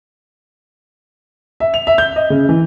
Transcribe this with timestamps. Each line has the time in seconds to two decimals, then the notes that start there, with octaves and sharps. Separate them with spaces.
1.60 E5
1.74 F7
1.87 E5
1.98 G6
2.16 D#5
2.30 C#3
2.49 E3